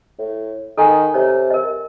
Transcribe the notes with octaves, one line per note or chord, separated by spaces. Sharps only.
A2
D#3 A4 G#5
C3 C#5
A#4 D#5